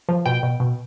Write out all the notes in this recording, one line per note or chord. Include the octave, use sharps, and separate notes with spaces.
F3
B2 G5
B2
B2